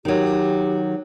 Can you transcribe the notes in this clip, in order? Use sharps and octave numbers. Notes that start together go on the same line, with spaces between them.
D#3 F#3 G4